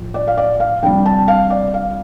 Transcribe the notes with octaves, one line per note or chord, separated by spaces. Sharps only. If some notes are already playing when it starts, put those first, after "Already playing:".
Already playing: A2 F3
D5
F5
D5
F5
F2 C3 G3 D4 G5
A5
F5
D5
F5